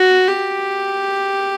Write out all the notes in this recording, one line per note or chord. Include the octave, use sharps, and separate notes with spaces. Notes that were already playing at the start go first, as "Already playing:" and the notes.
Already playing: F#4
G4